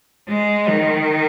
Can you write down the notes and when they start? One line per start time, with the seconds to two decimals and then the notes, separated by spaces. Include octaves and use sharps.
0.29 G#3
0.68 D#3